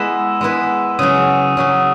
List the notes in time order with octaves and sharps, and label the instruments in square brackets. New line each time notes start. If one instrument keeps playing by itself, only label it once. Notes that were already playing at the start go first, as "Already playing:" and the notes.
Already playing: [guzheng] G#3 B3 E4 B4 [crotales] E6 E7
[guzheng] G#3 B3 E4 B4
[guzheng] C#3 F#3 C#4 [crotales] D#6 D#7
[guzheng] C#3 F#3 C#4